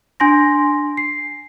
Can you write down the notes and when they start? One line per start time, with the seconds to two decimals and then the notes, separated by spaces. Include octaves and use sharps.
0.20 D4 G#5 C6 A#6
0.97 C7